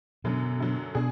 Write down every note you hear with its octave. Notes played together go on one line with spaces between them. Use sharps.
F#2 B2 D3 F#3
F#2 D3 F#3
B2 D4 G#4